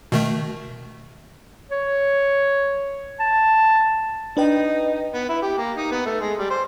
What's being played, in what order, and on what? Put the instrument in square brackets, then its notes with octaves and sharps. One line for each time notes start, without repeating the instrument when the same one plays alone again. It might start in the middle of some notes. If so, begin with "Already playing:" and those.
[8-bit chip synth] B2 D#3 A3
[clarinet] C#5
A5
[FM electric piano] D4 B4 G5 [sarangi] D#4
[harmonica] B3
E4
G4
A#3
D#4
B3
A3
G#3
G3
C5